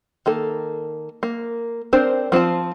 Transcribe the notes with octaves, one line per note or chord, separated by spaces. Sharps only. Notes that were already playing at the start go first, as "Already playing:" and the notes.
D#3 A#3 A4
A#3
C4 D4 A#4 C5
F3 C4 F4 A5